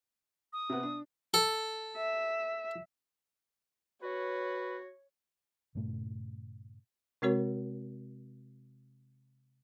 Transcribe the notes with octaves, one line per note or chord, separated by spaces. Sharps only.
D#6
C3 B3
D4
A4
E5
F#4 B4 C#5
G2 A#2 C#3 A3
C3 G#3 C4 F#4 A#4 C#5